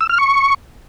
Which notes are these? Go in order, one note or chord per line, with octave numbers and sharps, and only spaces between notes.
E6
F6
C#6